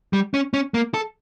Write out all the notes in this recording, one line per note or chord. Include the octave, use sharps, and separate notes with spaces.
G3
C#4
C#4
A#3
A4